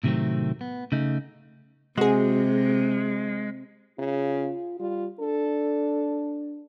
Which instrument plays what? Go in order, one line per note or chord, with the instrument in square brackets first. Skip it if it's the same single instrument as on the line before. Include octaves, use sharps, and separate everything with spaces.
[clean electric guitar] A2 C3 D#3 F#3 A3 C4
B3
C#3 A3 D#4
[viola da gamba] C3 [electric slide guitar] G#3 [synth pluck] F#4 G#4
[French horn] C#3 [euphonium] F4
[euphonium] G3 [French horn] F4
[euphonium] D4 [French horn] A4